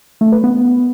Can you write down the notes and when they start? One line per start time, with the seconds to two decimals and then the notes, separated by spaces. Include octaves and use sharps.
0.21 A3
0.32 B4
0.44 B3